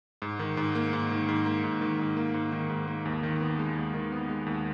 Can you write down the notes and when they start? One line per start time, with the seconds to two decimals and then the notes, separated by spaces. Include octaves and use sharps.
0.22 G#2
0.39 D#3
0.57 G#2
0.75 A#3
0.93 G#2
1.11 D#3
1.29 G#2
1.46 A#3
1.64 G#2
1.81 D#3
1.99 G#2
2.17 A#3
2.34 G#2
2.52 D#3
2.70 G#2
2.88 A#3
3.05 D#2
3.23 D#3
3.41 B3
3.59 G#3
3.76 D#2
3.94 D#3
4.12 B3
4.29 G#3
4.46 D#2